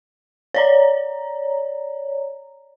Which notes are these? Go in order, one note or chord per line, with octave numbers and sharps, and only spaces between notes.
C#5 D5 A#5